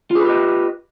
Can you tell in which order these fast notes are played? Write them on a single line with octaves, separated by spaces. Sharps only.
F4 G#4 B4 G4 D#5